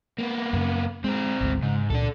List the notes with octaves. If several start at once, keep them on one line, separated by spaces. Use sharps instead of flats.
A#3 B3
F#2 C#3
G#3 C4 A#4
G#1 D2 G#3
G#2 C#3
C#2 A#2 D4 A4